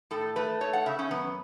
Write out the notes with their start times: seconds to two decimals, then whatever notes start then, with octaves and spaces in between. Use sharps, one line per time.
0.11 A2 A4
0.36 A3 B4
0.61 A3 C#5
0.73 F#5
0.86 C#3 E5
0.99 C#4
1.11 F#2 B3